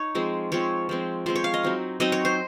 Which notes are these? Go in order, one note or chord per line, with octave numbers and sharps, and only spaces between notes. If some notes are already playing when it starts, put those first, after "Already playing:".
Already playing: D#4 C#5
F3 G#3 C4
F3 G#3 C4 C#5
F3 G#3 C4
F3 G#3 C4 C5
C#5
F5
D#5
F#3 C4 D#4
F#3 C4 D#4 D#5
C#5
C5